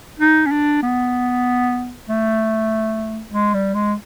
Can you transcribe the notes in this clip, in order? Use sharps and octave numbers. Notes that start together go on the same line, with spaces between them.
D#4
C#4
D4
B3
A3
G#3
G3
G#3